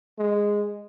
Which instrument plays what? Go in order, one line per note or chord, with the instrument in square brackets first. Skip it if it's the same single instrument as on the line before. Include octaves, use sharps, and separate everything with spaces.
[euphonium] G#3